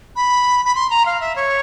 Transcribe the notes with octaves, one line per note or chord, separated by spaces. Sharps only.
B5
B5
C6
A#5
F5
E5
C#5